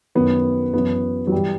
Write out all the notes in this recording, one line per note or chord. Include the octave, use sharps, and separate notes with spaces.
F#2 D#3 B3
F#2 E3 B3
F#3
G2 E3 G3